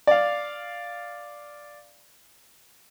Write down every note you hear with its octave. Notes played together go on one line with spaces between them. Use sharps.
D5 F5